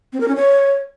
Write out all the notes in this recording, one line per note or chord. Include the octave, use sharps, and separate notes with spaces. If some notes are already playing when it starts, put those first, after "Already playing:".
C4
A#4
C#4
C#5